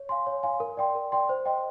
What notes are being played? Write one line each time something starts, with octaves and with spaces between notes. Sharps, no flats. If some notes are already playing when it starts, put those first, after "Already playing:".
Already playing: C#5
F5 G#5 C6
C#5
F5 G#5 C6
A#4
D5 G5 C6
A#4
D5 G5 C6
C5
D#5 G5 C6